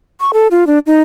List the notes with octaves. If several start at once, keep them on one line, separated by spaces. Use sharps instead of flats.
C#6
A4
F4
D4
D#4